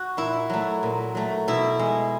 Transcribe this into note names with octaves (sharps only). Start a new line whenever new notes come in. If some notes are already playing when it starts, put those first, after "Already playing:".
Already playing: F#4
A#2 E4
F#3 A3
A#2
F#3 A3
B2 E4
G#3